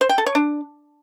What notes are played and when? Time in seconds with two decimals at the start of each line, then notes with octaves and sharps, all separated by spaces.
0.01 C5
0.09 G5
0.18 A4
0.26 C#5
0.35 D4